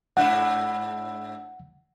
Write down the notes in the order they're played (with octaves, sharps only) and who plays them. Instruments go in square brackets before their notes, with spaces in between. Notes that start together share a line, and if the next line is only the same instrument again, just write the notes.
[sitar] G#2 D4 E4 [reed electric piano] F#5